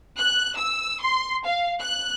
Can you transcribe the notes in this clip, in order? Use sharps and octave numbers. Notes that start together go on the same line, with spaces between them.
F#6
E6
C6
F5
F#6